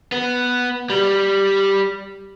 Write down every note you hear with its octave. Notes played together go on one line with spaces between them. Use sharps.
B3
G3